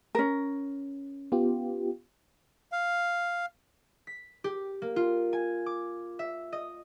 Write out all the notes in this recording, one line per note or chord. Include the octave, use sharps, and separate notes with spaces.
C#4 A#4
B3 F4 G4
F5
B6
G4
A#3
F4
G#5
D6
E5
D#5